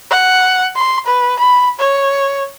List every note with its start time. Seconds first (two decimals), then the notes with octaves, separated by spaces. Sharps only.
0.11 F#5
0.75 C6
1.06 B4
1.39 B5
1.79 C#5